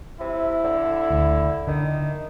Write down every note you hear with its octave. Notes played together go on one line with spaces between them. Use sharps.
C3 E4
D3
D2
D3 D#3